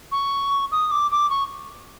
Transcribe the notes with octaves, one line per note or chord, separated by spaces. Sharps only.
C#6
D#6
D6
D6
C#6